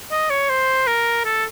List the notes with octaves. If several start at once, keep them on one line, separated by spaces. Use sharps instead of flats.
D#5
C#5
C5
A#4
A4